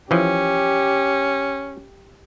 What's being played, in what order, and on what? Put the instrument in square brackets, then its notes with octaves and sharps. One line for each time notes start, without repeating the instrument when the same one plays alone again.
[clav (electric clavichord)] E3 F3 [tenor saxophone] C#4 [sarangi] G4